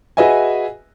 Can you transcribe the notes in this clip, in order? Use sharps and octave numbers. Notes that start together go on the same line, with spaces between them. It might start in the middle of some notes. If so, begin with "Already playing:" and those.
F#4 G#4 B4 D#5 E5 G#5